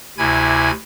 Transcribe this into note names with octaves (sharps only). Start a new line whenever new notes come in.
D2 C3 E4 G#5 G#6